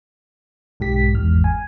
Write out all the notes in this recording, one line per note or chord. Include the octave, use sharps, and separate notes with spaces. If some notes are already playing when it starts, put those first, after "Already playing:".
B1 G#2 G4 B6
G#1 E2 G#2 F6
G#5